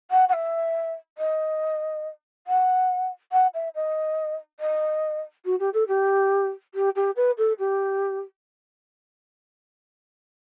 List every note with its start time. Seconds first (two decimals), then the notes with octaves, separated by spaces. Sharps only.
0.11 F#5
0.29 F#5
0.33 E5
1.18 D#5
2.47 F#5
3.32 F#5
3.54 E5
3.75 D#5
4.60 D#5
5.45 F#4
5.60 G4
5.74 A4
5.88 G4
6.74 G4
6.96 G4
7.16 B4
7.38 A4
7.59 G4